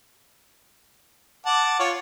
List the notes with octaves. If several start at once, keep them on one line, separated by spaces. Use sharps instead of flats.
F#5 A5 D6
F4 C#5